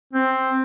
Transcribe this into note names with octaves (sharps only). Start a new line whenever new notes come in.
C4